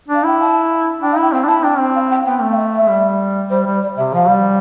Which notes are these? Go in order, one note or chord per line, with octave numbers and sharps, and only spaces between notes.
D4
F5
E4 G5
A5
D4 G5
F5
E4 G5
C4 G5
D4
E4 A5
D4 G5
C4
F5
G5
B3 G5
A3
F5
E5
E5
A3
G3
G3 C5
G3
D5
C3 E5
F3 F5
G3